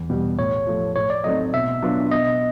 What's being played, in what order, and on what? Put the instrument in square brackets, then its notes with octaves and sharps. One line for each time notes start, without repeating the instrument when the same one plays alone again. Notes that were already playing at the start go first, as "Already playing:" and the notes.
Already playing: [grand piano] E2
B2 G3
[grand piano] A2 [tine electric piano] C#5
[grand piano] F3 A3
[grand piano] A2 [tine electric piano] C#5
[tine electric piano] D5
[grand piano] F#3 A3 C4 D#4 [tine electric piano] D#5
[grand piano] B2 [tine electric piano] E5
[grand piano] F#3 B3 D4 F4
[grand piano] B2 [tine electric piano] D#5